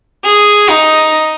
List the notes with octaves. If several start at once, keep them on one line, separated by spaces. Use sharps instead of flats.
G#4
D#4